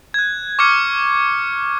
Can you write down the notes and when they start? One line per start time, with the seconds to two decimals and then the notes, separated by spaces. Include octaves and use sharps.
0.14 F#6 G#6
0.59 C#6 D6 F6 G#6 C#7